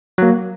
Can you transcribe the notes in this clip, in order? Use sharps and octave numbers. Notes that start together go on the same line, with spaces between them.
F#3 A#3